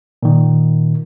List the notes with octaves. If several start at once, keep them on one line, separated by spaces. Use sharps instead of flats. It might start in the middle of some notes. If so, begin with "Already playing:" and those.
A#2 D#3